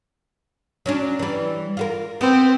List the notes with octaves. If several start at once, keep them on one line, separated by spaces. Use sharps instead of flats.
F#3 C#4 D4
E3 G3
F4 F#4 A#4
B3 C4